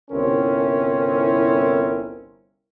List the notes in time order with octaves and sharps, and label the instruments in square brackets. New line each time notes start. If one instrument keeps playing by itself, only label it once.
[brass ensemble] G1 C2 C4 C#4 E4 A#4